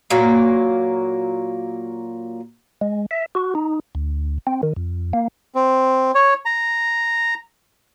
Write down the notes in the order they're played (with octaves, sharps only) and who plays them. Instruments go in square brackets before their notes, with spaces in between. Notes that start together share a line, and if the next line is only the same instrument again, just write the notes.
[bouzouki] A#2 F#3 A#3
[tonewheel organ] G#3
E5
F#4
D#4
D2
C4
D#3
F2
A#3
[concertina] C4
C#5
A#5